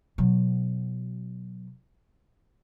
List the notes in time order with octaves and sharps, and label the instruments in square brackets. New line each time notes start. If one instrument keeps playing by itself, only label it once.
[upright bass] B2 F#3